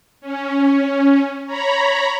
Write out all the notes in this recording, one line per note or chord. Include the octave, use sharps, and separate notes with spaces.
C#4
C#5 A#5 B5